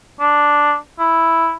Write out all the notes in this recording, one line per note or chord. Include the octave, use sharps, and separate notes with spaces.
D4
E4